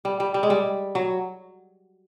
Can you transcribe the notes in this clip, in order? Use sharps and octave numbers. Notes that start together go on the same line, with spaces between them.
G3
G3
G3
G#3
G3
F#3